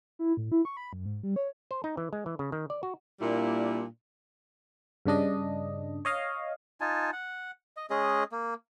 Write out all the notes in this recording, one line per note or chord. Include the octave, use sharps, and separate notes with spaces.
E4
A2
E4
C#6
B5
F#2
G#2
G3
C#5
C5
D#4
E3
G#3
E3
C#3
D#3
D5
F#4
A#2 G3 A#3 D4 E4
G2 C#3 D4 D#5
C#5 D#5 F5
D#4 F4 G#5 A5
F#5
D#5
G#3 C#4 G#4 D#5
A#3